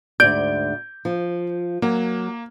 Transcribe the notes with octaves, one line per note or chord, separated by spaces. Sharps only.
D2 G#2 D5 G6 D7
F3
F#3 A#3